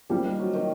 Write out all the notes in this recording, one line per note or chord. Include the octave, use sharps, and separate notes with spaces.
F3 G3 A#3
D#3
F#3
D#3